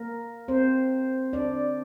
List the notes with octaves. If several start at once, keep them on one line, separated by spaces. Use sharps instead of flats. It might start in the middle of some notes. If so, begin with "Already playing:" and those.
Already playing: A#3 A#4
C4 C5
D4 D5